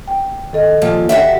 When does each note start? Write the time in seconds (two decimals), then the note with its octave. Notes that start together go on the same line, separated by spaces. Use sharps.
0.08 G5
0.53 D#3 A4 D#5
0.82 A#2 F3 G3
1.09 F#4 G4 E5